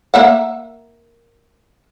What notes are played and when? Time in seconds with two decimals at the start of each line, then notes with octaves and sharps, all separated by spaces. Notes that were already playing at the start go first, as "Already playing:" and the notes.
0.14 A#3 E5 F#5